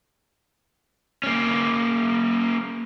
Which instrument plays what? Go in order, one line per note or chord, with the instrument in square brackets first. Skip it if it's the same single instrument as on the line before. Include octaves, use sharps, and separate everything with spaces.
[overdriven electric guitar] A#3 C#4